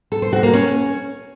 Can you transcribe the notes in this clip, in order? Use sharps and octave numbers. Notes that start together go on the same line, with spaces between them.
A4
C5
F#4
A#3
C#4